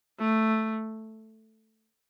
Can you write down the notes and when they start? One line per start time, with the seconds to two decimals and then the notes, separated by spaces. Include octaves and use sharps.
0.19 A3